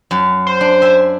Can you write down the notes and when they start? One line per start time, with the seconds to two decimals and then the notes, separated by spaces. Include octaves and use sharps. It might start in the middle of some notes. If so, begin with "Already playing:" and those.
0.11 F#2
0.47 C5
0.61 D4
0.82 E5 G#5